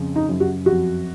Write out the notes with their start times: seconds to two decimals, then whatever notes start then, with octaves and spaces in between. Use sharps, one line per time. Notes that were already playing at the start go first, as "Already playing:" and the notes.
Already playing: F2 C#3
0.16 D#4
0.29 F#2
0.40 F#4
0.65 F2 F#4